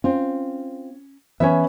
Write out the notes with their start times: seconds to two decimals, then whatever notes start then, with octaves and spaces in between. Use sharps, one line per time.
0.04 C4 C#4 F4
1.40 E3 B3 C#4 C#5 E5